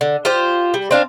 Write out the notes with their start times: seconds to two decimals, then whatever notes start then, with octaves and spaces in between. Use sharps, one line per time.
0.01 D3
0.25 F4 G4 C5
0.74 G3
0.91 C4 D4 F5